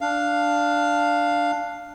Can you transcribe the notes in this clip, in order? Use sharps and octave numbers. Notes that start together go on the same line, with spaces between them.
D4 F5